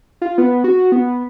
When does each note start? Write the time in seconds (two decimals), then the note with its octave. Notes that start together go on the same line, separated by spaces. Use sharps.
0.22 F4
0.38 B3
0.64 F#4
0.92 B3